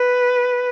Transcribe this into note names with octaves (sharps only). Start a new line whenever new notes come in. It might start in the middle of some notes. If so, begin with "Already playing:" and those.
Already playing: B4